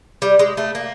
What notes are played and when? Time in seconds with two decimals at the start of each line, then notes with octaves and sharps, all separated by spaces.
0.22 G3
0.39 G#3
0.57 A3
0.75 A#3